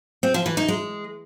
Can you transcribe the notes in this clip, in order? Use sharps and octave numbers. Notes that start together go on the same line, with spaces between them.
C4
F3
E3
D#4
G#3